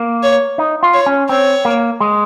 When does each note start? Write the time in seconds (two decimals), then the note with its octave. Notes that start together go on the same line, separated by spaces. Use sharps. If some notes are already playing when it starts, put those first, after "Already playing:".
Already playing: A#3
0.23 C#5
0.58 D#4
0.83 F4
0.94 C#5
1.06 C#4
1.29 C4 C#5
1.65 A#3
2.00 G#3